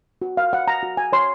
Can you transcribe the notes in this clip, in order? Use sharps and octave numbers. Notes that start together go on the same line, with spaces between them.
F#4
F5
C#5 F#5
A#5
F#4
G#5
C#5 C6